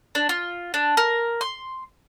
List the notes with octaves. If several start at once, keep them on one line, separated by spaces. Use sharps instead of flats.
D4
F4
D4
A#4
C6